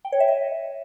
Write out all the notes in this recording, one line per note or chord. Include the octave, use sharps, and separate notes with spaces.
G5
C#5
E5
D#5